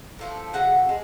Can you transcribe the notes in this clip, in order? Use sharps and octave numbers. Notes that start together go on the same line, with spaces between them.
A2 F3 A3
C#3 F#3 A3 F#5
G#3